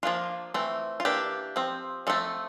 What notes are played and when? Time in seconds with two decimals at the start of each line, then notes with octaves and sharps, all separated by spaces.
0.03 F3 A#3 D4 F4
0.54 E3 A3 C4
1.00 F4
1.05 E3 A#3 D4 G4
1.56 F3 C4
2.07 F3 A3 C4 A4